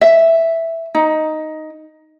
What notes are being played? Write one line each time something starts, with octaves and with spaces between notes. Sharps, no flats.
E5
D#4